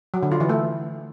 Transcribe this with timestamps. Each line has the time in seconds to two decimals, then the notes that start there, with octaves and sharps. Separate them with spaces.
0.14 F#3
0.23 D3
0.31 F4
0.40 E3
0.49 A3